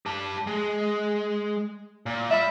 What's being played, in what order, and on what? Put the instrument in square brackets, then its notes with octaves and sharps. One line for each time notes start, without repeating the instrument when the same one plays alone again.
[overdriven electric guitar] G4 A5
G#3
A#2
[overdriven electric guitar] D5 B5 [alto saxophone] E5